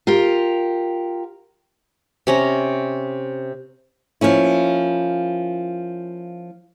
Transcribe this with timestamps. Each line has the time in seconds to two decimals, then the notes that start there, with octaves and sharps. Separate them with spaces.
0.07 F4 G4 A#4
2.27 C3 C#4 A#5
4.21 F3 A#3 C#4 E4